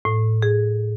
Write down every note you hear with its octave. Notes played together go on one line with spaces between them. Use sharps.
A2
G#4